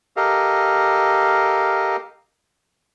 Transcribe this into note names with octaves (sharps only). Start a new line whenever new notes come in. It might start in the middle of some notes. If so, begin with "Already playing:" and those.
G4 A4 A#4 D#5 F5